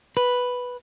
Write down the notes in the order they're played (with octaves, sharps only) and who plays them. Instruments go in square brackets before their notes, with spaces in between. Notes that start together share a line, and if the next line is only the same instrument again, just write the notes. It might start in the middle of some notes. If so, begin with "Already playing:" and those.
[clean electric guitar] B4